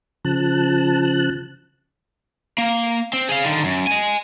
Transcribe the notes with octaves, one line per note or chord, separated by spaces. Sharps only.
C#3 F3 A5 F#6
A#3
C4
G#4 F5
D3 D#3
F#2
D#5 G#5